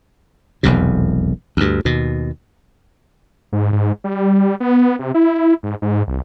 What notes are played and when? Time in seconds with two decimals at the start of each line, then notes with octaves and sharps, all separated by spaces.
0.63 E1 B1 F2 C3
1.57 D2 G2
1.85 D#2 B2
3.52 G#2
3.72 G#2
4.04 G3
4.60 B3
4.99 C3
5.14 E4
5.63 G#2
5.82 G#2
6.08 C2